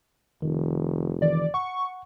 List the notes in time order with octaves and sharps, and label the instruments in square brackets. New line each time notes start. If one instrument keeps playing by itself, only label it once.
[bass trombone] F1 [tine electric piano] D#3
[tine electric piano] D#3 E3 [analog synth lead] D5
[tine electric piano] F#5 [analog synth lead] C#6